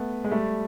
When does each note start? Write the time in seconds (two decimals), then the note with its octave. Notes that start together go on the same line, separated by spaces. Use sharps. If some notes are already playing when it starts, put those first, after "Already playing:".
Already playing: A3 B3
0.24 G#3
0.31 G3 A3